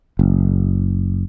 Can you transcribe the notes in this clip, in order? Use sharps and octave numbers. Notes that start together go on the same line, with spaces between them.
F#1